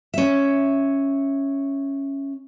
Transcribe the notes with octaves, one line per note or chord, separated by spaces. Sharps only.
C#4 E5